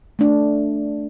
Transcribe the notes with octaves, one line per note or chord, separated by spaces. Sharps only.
A3 D4